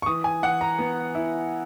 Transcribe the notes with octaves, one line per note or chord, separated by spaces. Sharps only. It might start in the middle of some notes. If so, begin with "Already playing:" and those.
C#6
E3 D#6
G#5
E3 F#5
A#5
B3
E4